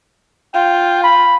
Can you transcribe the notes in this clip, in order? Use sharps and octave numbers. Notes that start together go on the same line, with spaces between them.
F4 G5
B5